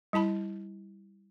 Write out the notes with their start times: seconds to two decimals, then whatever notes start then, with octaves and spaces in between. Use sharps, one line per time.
0.13 G3 E4 A5 B5